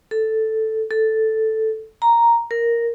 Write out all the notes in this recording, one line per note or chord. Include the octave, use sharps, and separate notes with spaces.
A4
A4
A#5
A#4